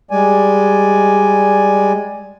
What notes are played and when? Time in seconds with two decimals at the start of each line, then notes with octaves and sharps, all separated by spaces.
0.11 G3 G#3 D5 G#5